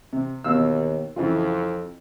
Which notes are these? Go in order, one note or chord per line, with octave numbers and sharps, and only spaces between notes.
C3
D#2 B2 F5 E6
F2 C#3 E3 F4